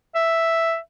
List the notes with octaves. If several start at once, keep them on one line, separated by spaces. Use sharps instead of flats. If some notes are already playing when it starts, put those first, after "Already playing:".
E5